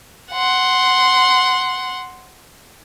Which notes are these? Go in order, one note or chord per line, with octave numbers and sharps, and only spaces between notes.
F#5 C6